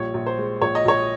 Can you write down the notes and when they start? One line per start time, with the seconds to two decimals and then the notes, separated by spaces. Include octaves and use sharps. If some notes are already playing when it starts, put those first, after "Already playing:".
Already playing: A#1 G3 C#5
0.14 A#1
0.26 C5
0.38 G#3
0.61 A#1 C#5
0.75 D#5
0.85 A#1 C#5